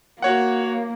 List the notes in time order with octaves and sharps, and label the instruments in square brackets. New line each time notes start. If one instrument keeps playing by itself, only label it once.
[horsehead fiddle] A#3 [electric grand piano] F#4 C#5 F#5